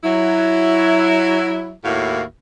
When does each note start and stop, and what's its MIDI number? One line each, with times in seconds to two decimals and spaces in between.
0.04 1.72 54
0.04 1.72 64
1.85 2.22 39
1.85 2.22 45
1.85 2.22 58
1.85 2.22 64
1.85 2.22 66
1.85 2.22 77